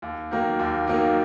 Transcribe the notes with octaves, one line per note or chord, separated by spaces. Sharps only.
D#2
D#3 F#3 A#3
D#2
D#3 F#3 A#3